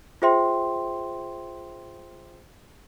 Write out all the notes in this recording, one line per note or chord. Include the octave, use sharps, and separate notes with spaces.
F4 G#4 C5 E5 G5 C6